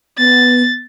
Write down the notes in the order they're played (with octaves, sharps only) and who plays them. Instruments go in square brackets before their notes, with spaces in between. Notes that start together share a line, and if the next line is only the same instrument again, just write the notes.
[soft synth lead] B3 [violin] A6